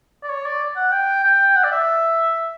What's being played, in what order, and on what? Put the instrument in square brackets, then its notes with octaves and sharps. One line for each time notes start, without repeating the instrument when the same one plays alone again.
[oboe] D5
C#5
D5
F#5
G5
G5
F#5
D5
E5